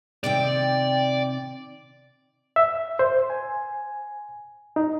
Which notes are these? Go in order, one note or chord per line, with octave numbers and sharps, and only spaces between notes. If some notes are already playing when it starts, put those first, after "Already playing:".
C3 D#3 D5 G5
E5
C5
G#5
D#4